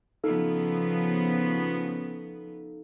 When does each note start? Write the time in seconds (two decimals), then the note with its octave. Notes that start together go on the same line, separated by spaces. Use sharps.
0.24 C#3 F3 B3 D#4 A4 F5